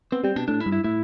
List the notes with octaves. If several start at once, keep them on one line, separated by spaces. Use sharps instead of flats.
B3 C4
G3 C4
B2 D4
A2 D4
E4
G2
E4
A2 E4